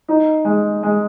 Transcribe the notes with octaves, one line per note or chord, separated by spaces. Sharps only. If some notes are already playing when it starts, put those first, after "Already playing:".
D#4
G#3
G#3